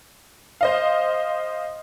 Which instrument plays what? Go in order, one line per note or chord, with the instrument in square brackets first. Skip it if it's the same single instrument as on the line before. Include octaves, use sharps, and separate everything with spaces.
[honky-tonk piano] C5 D#5 F5